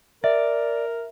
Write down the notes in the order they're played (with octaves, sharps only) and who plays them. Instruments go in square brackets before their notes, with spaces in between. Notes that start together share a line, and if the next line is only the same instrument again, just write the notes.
[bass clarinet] A#4 [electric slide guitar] D5 [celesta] E5